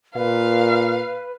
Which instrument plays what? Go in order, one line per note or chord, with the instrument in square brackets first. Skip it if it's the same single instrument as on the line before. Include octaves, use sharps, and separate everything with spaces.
[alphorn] A#2 [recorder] B4 [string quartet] F5